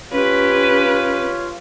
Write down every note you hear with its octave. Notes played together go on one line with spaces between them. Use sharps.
C#4 F4 G4 B4 C#5